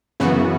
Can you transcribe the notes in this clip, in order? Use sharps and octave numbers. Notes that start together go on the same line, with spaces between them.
F#2 C#3 E3 B3 F#4